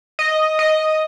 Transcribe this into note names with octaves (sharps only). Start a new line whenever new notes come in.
D#5
D#5